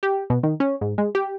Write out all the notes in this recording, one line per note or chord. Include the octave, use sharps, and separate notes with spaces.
G4
B2
D#3
C#4
G#2
G#3
G4